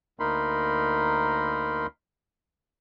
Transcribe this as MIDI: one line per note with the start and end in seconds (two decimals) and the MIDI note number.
0.20 1.86 38
0.20 1.86 58
0.20 1.86 63
0.20 1.86 70
0.20 1.86 83
0.20 1.86 84